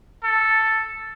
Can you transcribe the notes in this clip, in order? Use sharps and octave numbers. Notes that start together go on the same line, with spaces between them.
A4